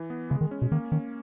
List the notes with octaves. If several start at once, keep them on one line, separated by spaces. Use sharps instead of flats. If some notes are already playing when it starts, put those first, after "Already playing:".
Already playing: E3
B3
C#3 G#3
D#3
C#4
B2
D#3 A#3
D#3 C#4